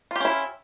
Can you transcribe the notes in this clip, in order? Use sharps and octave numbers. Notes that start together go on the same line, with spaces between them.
C#4 E4 F4 G4